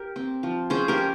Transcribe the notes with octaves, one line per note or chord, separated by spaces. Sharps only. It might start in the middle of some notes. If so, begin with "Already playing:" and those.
Already playing: G4 A#4
C4
F3
C#4 G#4 C5
G4 A#4
C#4